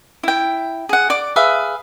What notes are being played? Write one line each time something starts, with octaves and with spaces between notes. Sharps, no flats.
E4 G5
G#4 F#5
D5 D6
G#4 B4 E5 F5